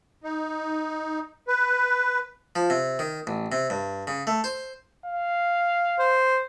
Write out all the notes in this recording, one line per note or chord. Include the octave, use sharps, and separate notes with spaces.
D#4
B4
F3
C3
D#3
A1
C3
G2
C#3
A3
C5
F5
C5